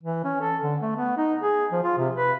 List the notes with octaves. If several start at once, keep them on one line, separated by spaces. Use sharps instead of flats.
E3
C#4
A4
D3
A3
B3
D#4
G#4
F3
F4
C3
B4